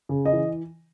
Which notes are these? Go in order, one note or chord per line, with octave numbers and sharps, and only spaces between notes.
C#3
D#5
E3